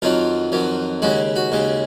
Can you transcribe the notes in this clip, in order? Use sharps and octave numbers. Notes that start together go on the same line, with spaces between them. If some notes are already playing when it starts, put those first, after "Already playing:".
F2 D#3 F#3 F4
F2 D#3 F#3
D#2 C#3 G#3 F#4
F#4
D#2 C#3 G#3